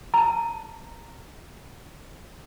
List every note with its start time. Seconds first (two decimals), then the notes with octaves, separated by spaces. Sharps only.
0.14 A5 A#5